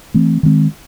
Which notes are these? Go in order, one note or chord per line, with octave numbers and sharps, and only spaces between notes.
E3 A3 C4
D#3 G#3 C4